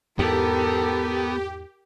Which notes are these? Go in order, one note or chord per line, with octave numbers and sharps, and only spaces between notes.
E2 G#2 B3 G4 A4 A#4